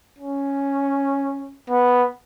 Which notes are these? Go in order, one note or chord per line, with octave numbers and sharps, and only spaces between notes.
C#4
B3